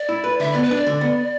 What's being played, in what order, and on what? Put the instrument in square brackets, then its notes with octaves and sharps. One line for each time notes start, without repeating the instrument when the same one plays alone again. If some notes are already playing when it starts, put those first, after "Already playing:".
Already playing: [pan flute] D5
[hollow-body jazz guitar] E4
B4
[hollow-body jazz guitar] D3 [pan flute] E5
[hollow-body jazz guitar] B3 [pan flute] D5
[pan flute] B4
[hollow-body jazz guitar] D4 [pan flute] D5
[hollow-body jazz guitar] D3
B3